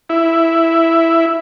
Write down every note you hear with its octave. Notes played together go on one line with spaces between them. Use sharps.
E4